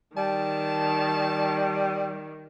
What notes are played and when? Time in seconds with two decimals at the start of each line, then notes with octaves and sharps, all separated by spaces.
0.17 D#3 G3 A5